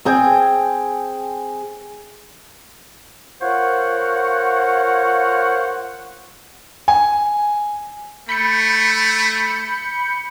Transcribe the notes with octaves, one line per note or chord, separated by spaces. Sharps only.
C4 G#4 G5 G#5
F4 A#4 C5 C#5 F#5
G#5
A3 B5 G6 C#7